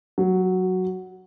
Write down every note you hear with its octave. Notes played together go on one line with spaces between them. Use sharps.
F#3